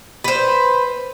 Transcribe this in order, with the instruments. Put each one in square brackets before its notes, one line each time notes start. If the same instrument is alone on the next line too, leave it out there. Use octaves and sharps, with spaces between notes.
[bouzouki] B4 C5